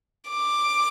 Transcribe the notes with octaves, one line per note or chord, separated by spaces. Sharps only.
D6